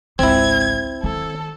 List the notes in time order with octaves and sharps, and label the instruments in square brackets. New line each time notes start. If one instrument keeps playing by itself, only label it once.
[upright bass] G#1 C#2 [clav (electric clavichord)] C4 E4 [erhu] G#6
[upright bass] D#3 D#4 [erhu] A4